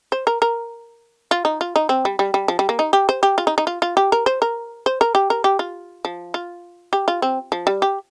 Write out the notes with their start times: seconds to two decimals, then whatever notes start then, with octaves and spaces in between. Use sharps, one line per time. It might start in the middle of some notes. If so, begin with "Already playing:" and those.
0.12 C5
0.27 A#4
0.42 A#4
1.31 F4
1.45 D#4
1.61 F4
1.76 D#4
1.89 C4
2.05 G3
2.19 G3
2.34 G3
2.48 F3
2.59 G3
2.69 A#3
2.79 D#4
2.93 G4
3.09 C5
3.23 G4
3.38 F4
3.47 D#4
3.58 D#4
3.67 F4
3.82 F4
3.97 G4
4.12 A#4
4.26 C5
4.42 A#4
4.86 C5
5.01 A#4
5.15 G4
5.30 A#4
5.44 G4
5.59 F4
6.05 F3
6.34 F4
6.93 G4
7.08 F4
7.22 C4
7.52 F3
7.67 G3
7.82 G4